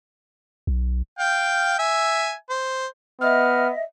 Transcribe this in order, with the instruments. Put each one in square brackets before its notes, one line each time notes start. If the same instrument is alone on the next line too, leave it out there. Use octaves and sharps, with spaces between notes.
[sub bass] B1
[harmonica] F5 G5
E5 G#5
C5
[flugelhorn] B3 [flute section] D#5 E5 [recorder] F6